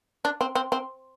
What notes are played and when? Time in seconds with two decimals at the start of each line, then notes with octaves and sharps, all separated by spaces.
0.25 D4
0.41 C4
0.55 C4
0.72 C4